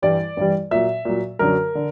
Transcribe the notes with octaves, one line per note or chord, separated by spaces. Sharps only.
G2 E3 G3 D5
G2 E3 G3
A#2 F#3 E5
A#2 F#3
F#2 D3 F#3 A#4
D3